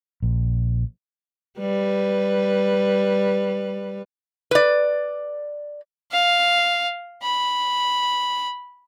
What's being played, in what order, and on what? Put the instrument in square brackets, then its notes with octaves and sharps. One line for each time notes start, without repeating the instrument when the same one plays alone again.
[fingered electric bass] A#1
[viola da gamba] G3 B4
[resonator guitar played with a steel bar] B4 D5
[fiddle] F5
B5